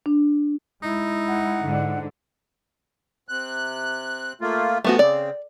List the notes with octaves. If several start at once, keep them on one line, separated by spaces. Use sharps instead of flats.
D4
G#3 D#4 E4
F#5
G#2 D3
C3 F#6
A3 A#3 F4
E3 F3 A3 B3 F#4
C#3 C4 D5